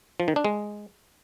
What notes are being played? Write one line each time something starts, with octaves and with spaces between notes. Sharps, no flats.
F3
D#3
D4
G#3